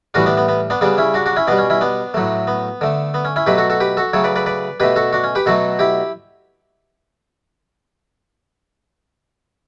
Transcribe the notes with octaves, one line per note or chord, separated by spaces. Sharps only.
A2 E3 G3 D4 F#4
B3 D4
B3
B3
B3 D4
C#3 G3 B3 D4
C#4 E4
D4 F#4
D4 F#4
C#4 E4
B2 G3 B3 D4
C#4
C#4 E4
B3 D4
A2 F#3 A3
B3
D3 A3
B3
C#4
C#4 E4
B2 F#3 A3 G4 B4
F#4 A4
F#4 A4
G4 B4
F#4 A4
C#3 F#3 A3 A4 C#5
B4 D5
B4 D5
B4 D5
B2 A3 G4 B4
F#4 A4
D4 F#4
C#4
G4 B4
B2 F#3 A3 F#4 A4
E4 G4